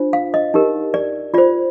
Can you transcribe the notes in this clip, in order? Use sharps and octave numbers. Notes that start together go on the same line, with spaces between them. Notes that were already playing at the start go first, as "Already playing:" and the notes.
Already playing: D4 F4 C5
F5
D#5
D#4 G4 A#4
D5
F4 C5 D5